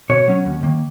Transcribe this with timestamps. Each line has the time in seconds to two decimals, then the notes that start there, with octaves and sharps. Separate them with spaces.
0.10 B2 C#5
0.28 F#3 C#4
0.45 D#2
0.63 D#3 A#3